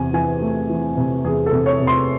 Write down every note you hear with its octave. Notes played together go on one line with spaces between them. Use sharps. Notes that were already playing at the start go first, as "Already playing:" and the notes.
Already playing: E2 C3 G#5
E3 G#5
A3
E3
C3
E2 G#4
A4
C3
C#5
C3
C6